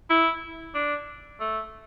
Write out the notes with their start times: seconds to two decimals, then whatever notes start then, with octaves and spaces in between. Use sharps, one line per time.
0.10 E4
0.74 D4
1.40 A3